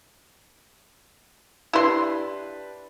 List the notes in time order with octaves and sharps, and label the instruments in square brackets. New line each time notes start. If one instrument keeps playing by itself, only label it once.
[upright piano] D4 G4 B4 [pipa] E4 C6